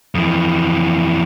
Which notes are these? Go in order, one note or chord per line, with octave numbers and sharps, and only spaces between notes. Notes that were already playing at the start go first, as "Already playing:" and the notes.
F2 E3